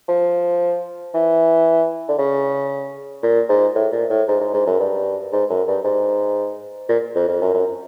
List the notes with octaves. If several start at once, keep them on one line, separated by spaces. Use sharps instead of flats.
F3
E3
D3
C#3
A#2
G#2
A2
A#2
A2
G#2
G#2
G#2
F#2
G2
G#2
F#2
G2
G#2
A#2
F2
F2
F#2
F#2